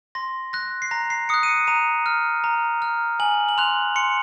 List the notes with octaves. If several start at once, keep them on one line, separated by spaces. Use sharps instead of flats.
C6 A#6
F#6 A#6
C7
A#5 A#6
C7
D#6 F#6 C#7
D#7
C#7
A#5 D#7
F6
A#5
F6
G#5 F#7
F#7
C6 F#6 F7
C6 C#7